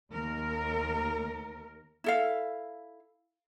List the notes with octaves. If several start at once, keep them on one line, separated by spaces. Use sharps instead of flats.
D#2 A#4
E4 A4 F5